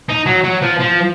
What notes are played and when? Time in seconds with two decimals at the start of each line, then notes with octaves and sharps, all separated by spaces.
0.09 D#4
0.26 F#3
0.44 F#3
0.62 F3
0.80 F3